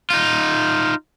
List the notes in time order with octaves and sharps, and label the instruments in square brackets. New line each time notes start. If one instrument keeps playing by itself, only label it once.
[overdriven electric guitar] D#4 F4